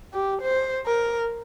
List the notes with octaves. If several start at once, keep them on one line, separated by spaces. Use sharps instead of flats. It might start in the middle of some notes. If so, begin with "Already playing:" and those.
G4
C5
A#4